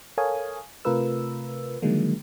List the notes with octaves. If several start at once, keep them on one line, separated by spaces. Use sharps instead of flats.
A4 A#4 C#5 F5 G#5 D#6
C3 A3 F4 A#4 B4 E6
D3 D#3 F3 F#3 G#3 A#3